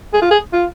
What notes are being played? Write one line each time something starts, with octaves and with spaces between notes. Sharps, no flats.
G#4
F4
G#4
F4